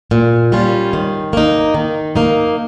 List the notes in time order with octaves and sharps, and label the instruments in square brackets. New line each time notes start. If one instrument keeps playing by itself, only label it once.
[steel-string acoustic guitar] A#2
G3 C#4 F4
D#3
A#3 D#4
D#3
A#3 D#4